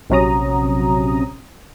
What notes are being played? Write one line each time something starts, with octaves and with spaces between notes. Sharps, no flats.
A#1 C3 F#3 C#4 A#5 D#6